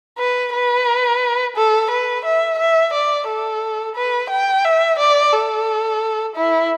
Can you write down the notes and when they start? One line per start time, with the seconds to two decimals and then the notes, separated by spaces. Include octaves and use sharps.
0.18 B4
0.53 B4
1.56 A4
1.91 B4
2.25 E5
2.59 E5
2.93 D5
3.28 A4
3.96 B4
4.30 G5
4.64 E5
4.99 D5
5.33 A4
6.36 E4